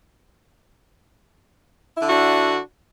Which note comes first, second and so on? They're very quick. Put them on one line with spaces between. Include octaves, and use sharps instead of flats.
E4 D3 F#4 D4